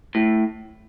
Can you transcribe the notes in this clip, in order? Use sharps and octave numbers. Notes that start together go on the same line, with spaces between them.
A2